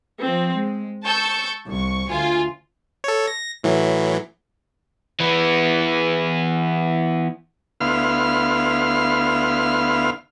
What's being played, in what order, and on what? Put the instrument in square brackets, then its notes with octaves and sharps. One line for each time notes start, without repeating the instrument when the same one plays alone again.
[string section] F3 C4
G#3
A5 C#6 E6 G6
C2 C#6
D2 F4 G#5
[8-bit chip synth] A4 C#5
A#6
A2 E3 F#3
[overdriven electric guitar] E3 B3
[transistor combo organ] D2 B3 E4 F5 C6 F6